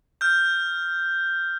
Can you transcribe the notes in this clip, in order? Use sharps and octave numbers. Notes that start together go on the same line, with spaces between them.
F6 G6